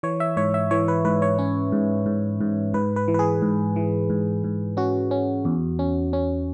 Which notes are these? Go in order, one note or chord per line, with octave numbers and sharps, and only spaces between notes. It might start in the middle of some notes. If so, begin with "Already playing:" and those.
E3 C#5
E5
G#2 C#5
E5
E3 C#5
B4
G#2 B4
C#5
C#4
G#2
G#2
G#2
G#2 B4
B4
E3
B4
G#4
G#2
E3
G#2
G#2
C#4 F#4
C#4
E2
C#4
C#4